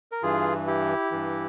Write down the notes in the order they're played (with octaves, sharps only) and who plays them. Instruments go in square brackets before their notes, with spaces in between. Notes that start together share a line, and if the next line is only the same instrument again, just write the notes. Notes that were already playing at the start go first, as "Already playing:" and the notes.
[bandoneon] A#4
G2 E3 F4 G#4
E4 G4
G2 E3